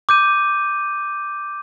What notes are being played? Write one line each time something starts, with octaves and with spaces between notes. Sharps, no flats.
D6 G6 D#7